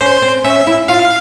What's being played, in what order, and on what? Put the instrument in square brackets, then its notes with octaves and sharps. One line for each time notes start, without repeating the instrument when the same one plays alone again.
[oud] C#4 [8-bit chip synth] C5
[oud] C4
[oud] C#4 [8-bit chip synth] E5
[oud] E4
[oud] F4 [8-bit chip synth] F5